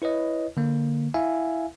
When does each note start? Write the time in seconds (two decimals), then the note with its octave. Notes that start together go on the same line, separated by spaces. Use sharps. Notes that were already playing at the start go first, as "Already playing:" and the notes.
0.02 E4 B4 C#5 D#5
0.57 D3 A#3
1.14 E4 E5 F5 G#5